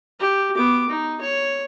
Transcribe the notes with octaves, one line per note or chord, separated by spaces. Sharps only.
G4
B3 D6
D#4
C#5